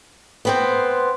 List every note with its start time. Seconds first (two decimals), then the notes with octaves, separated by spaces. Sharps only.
0.45 B3 C4 C5